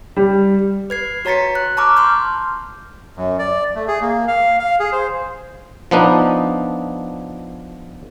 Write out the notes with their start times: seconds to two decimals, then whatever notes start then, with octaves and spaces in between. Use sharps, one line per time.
0.17 G3
0.90 B4 G#6 C7
1.25 F#4 C#5 A#5 A6 B6 C#7
1.55 F#6
1.77 A5 A#5 C#6 D6 F6
1.97 C6 F6 G6
3.17 F#2
3.39 D5
3.75 A3
3.88 G#4
4.01 A#3
4.28 F5
4.59 F5
4.80 G#4
4.92 C5
5.91 F3 B3 D4 D#4